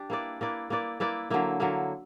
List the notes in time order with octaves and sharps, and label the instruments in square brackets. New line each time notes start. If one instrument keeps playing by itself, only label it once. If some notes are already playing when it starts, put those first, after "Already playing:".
Already playing: [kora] D4 G4
A#3 E4 B4 D5
A#3 E4 B4 D5
A#3 E4 B4 D5
A#3 E4 B4 D5
D3 F#3 A#3 E4
D3 F#3 A#3 E4